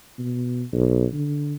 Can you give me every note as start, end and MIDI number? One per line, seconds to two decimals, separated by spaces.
0.18 0.63 47
0.73 1.06 35
1.13 1.54 50